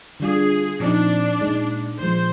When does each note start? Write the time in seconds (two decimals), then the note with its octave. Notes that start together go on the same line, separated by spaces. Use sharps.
0.20 D3 G3 D4 F4 G#4
0.80 A#2 F3 C4 D4 D#4
1.41 A#2 G#3 D#4
2.00 A#2 F3 G#3 C5